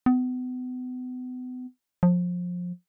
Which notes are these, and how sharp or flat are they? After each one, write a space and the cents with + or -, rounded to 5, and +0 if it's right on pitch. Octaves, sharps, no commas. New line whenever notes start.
B3 +35
F3 +25